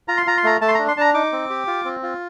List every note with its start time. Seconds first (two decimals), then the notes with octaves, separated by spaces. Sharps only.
0.08 F4 A#5
0.17 C6
0.26 F4 A#5
0.37 C6
0.44 A3 A#5
0.61 A3 A5
0.68 C6
0.75 D4 A#5
0.88 C6
0.97 D4 A5
1.01 A#5
1.14 D#4 D6
1.32 C4
1.50 G4
1.67 F4
1.85 C4
2.03 F4